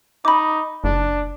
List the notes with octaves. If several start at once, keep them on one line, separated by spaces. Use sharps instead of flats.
D#4 B5 D6
F#1 D4